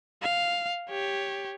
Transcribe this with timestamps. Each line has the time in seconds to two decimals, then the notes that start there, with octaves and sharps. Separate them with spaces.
0.23 F5
0.90 G4 C#5